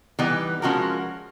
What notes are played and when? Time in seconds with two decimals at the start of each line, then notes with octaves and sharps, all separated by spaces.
0.19 E3 G3 B3 D#4
0.62 F3 G#3 C#4 F#4 A#4